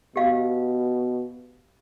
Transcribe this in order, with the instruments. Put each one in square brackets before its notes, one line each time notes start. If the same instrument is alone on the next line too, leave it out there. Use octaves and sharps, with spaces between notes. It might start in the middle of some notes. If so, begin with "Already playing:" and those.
[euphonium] B2 [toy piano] G4 F5